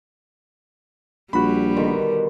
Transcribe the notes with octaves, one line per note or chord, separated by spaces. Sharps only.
A#1 G3 F#4 B5
B2 D3 D#3